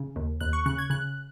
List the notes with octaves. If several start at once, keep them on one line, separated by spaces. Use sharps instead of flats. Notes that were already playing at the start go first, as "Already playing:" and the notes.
Already playing: C#3
D#2
D#2 F#6
C#6
C#3 F#6
G#6
C#3 F#6